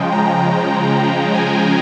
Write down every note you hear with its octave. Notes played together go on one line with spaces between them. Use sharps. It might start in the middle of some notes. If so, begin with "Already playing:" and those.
Already playing: C#3 F3 G#3 G5
A#5
G#5